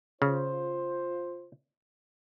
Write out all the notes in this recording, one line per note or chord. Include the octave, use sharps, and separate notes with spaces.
C#3 F4 C5